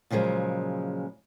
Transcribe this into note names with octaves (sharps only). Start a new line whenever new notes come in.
A#2 C#3 F3 F#3 G#3